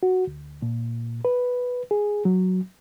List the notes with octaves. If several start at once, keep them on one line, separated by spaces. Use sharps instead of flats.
F#4
D2
A#2
B4
G#4
F#3